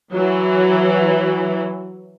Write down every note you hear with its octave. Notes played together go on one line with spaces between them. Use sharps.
E3 F#3